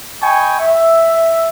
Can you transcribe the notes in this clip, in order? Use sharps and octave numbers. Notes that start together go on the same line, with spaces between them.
D#5 G5 G#5 B5 C#6
E5